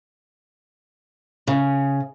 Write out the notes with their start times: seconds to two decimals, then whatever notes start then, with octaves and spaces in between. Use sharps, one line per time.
1.47 C#3